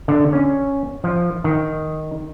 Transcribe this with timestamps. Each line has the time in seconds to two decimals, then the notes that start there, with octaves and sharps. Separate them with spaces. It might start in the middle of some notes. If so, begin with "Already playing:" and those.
0.08 D3
0.33 C#4
1.04 F3
1.44 D#3